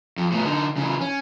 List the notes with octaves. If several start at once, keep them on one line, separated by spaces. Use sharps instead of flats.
F2
A2 B3
D3 D#4
C#3 E3
C#4